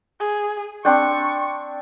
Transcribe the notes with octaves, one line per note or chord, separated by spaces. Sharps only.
G#4
C4 D4 G5 C#6